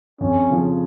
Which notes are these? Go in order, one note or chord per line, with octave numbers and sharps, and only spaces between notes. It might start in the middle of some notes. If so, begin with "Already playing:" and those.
F2 C#4
C#3 F3